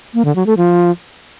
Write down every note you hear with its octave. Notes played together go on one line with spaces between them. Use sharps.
A#3
D3
F#3
A3
F3